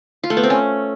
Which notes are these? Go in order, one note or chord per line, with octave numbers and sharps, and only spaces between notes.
F4
A3
B3
C4
C#4